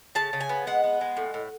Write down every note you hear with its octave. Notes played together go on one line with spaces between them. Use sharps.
C#3 A5
C#3
G#5
B3
G#3 F#5
B3
G#3
A2
A2